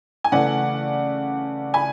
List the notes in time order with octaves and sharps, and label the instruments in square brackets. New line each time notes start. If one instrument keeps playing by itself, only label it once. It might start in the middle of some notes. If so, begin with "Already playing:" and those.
[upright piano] G#5
C#3 E3 A3 D5 F#5
G#5 B5